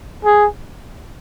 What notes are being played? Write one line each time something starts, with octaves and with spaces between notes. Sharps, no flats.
G#4